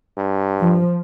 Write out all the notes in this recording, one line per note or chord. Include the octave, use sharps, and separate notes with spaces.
G2
F3